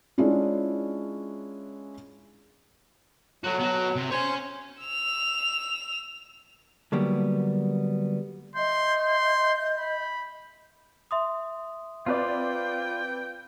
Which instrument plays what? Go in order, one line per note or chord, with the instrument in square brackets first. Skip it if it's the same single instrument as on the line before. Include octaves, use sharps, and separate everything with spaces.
[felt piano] G#3 C#4 D4 E4 F4
[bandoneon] F#3 [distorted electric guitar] A3 F#4
[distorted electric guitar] B3 F#4
C3
[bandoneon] C5 [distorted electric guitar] C#5 G#5
[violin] E6 F7
[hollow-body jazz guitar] D3 F#3 G3 A#3 B3
[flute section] D#5 E5 G6 [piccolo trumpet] C6
[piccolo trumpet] C6
B5
[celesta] E5 C6 D#6
[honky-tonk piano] C4 B4 D5 [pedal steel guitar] F4 [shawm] G5